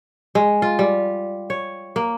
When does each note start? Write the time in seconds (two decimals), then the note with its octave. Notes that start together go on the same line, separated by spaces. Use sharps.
0.35 G#3
0.62 F4
0.79 G3
1.50 C#5
1.96 A#3